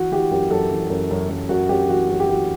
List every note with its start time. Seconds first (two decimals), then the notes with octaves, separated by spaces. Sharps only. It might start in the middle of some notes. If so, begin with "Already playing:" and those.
Already playing: E3 F#4
0.12 E3 G4
0.31 F#2 G4
0.50 F#2 A4
0.71 E3
0.90 F#2
1.11 F#2
1.29 F#2
1.49 F#2 F#4
1.69 F#2 G4
1.89 E3 F#4
2.09 F#2 G4
2.20 G4
2.29 E3 F#4